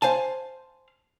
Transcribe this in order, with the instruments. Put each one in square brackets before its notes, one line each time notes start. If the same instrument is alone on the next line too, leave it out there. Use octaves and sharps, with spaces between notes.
[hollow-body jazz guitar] C5 F5 G#5 A5